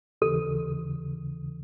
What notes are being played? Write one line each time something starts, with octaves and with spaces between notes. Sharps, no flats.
D#2 C#3 E3 A4